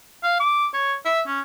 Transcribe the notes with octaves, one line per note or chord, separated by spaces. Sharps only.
F5
D6
C#5
E5
C#4